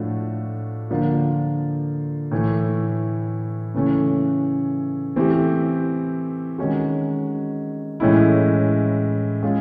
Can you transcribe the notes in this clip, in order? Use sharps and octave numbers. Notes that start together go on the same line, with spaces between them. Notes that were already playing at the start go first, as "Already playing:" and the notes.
Already playing: A2 F3 A3 D4 F#4
D3 F3 A#3 D4 F4
A2 E3 A3
C#3 E3 A3 C#4
E3 A3 C4 E4 G4
D#3 G#3 C#4 F#4
A2 E3 G#3 C#4 E4
G#3 C#4 F4 G#4